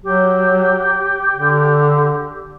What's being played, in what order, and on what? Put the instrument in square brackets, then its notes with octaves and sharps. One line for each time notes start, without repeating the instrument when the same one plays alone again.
[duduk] F#3 [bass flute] G4
[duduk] D3